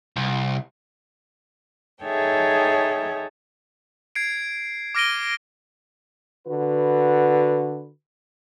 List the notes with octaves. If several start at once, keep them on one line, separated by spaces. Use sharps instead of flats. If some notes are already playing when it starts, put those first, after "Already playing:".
C2
D#4 G#4 A4 C#5 E5 G5
G#6 C7 D7
D6 F6 A#6 D7 D#7 G7
D3 F#4 B4